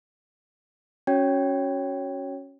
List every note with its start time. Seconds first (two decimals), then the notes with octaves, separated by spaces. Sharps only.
1.07 C#4 F#4 C#5 G5 G#6